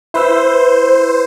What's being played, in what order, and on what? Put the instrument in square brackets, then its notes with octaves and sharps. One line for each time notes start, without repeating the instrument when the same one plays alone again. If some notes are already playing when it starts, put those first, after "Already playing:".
[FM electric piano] E4 B4 E6 [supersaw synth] C5